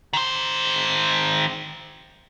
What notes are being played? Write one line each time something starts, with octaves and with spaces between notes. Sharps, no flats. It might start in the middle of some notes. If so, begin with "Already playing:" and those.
D#3 C5